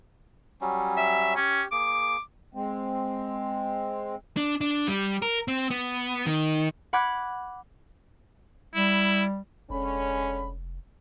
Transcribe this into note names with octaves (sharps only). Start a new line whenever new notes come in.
F#3 G3 C#4
E5
C#4 G4
A#3 G#4 D6
G#3 C4
D4
D4
G3
A#4
C4
B3
D#3
F#5 B5 D6 F#6 G#6
G3 E4
F1 D3 G#3 C#4 B5